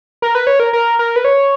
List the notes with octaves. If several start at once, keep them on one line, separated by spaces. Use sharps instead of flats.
A#4
B4
C#5
A#4
A#4
A#4
B4
C#5